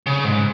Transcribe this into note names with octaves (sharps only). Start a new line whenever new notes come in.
C#3
G#2